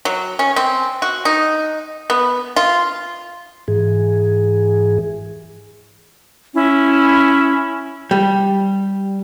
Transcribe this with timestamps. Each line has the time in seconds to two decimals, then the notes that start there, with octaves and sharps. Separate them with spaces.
0.05 F#3
0.39 C#4
0.56 C4
1.02 F#4
1.25 D#4
2.10 B3
2.56 F4
3.68 G#2 E3 G#4
6.54 C#4 E4
8.11 G3